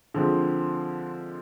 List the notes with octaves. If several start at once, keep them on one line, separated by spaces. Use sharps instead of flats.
D3 F3 G#3 C4